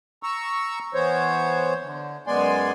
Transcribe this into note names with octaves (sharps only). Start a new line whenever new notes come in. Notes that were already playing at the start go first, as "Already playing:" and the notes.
A#5 C#6 E6
E3 B3 C5 C#5
D3
F#2 G#3 B3 D5 G#5 C6